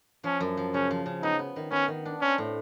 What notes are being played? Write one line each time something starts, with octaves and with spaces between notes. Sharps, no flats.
F3 C#4
F#2
F3
C#3 C#4
F3
C#3
B3 D#4
B3
D#3
B3 C#4
D#3
D4
C4 C#4
A2